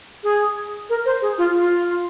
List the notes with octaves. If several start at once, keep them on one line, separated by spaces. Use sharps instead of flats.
G#4
A#4
C5
G#4
F4
F4